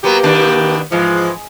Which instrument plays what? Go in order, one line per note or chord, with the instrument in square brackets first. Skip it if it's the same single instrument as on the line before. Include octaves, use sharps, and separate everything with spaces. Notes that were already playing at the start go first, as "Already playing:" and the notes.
[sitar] F#3 B3 [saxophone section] A#3 G4
[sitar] D#2 B2 D4
[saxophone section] G#2 E3 F3 [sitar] G#3